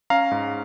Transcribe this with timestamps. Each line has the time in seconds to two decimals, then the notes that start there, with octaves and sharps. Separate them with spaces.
0.10 C#4 F5 A#5
0.31 G#2